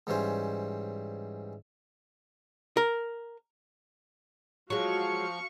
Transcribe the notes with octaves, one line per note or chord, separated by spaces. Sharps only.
G#2 E3 G3 C#4 C5
A#4
F3 F#3 G#3 F#4 F5 C#6